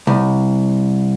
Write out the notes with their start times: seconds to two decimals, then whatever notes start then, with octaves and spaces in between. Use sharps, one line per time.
0.07 C2